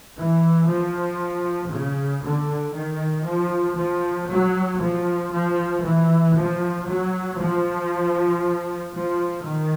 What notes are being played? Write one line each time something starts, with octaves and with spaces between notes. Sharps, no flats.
E3
F3
C#3
D3
D#3
F3
F3
F#3
F3
F3
E3
F3
F#3
F3
F3
D#3